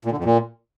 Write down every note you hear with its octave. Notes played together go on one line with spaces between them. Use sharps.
A#2
D3
F2
A#2